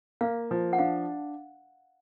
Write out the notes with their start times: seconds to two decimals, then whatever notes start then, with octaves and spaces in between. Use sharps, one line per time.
0.21 A#3 F5
0.51 F3
0.73 F#5
0.79 D4 F5